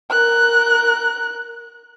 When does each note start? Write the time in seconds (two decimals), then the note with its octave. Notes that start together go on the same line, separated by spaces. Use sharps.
0.10 A#4 F#6